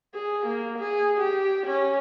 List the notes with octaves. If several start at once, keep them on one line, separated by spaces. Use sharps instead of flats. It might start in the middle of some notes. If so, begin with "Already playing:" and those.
G#4
A#3
G#4
G4
C#4